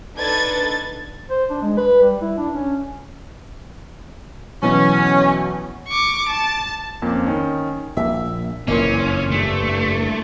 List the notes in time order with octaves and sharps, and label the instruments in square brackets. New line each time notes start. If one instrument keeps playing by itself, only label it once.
[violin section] D4 D#4 A4 B4 G#6 A6
[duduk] C5
D4
G#3
B4
G3
E4
D4
C#4
[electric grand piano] B2 E3 F#3 [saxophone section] C#4
[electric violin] C#6 D6
A5
[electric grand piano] F2 A#3 C#4
D#3 C#4
[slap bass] A#1 A#3 [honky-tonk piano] E5
[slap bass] F#1 F2 [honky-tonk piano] A#2 E3 A#3 [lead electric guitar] C#4
[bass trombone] G2 [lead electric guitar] A3